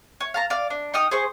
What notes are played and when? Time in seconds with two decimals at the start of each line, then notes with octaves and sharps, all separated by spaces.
0.21 C#5
0.34 F5 A5 A#5
0.50 D5 F5
0.70 D4
0.94 D#4 G5 D#6 F6
1.11 G#4 C5 C#6